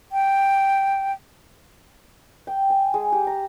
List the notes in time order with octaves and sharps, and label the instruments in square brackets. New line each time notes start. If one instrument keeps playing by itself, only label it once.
[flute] G5
[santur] G5
G#5
G#3
G4
A#5